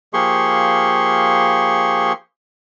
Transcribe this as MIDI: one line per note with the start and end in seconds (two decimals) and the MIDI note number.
0.13 2.12 53
0.13 2.12 58
0.13 2.12 67
0.13 2.12 68
0.13 2.12 84
0.13 2.12 85